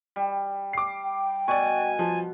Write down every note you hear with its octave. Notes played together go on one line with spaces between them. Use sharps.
G3
D6 C7
G5
B2 D5 G#5 C#6
F3 A5